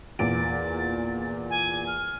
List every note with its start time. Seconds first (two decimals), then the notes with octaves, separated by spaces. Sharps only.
0.19 E2 A#2 A6 D7
1.50 G#5
1.87 F6